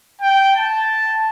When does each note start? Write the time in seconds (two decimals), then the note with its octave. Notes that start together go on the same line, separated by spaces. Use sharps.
0.21 G5
0.56 A5